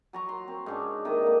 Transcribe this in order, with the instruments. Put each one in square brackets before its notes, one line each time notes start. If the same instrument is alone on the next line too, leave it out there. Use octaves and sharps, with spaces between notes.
[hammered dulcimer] F#3 A#5 C#6
C6
C4
G#2 C#4 D4
C3 D#3 D#5
D3 A#3